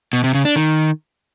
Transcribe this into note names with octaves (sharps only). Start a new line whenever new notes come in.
B2
C3
C#3
D4
D#3